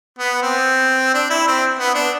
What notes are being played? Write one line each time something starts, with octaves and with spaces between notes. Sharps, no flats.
B3
C4
D4
E4
C4
B3
D4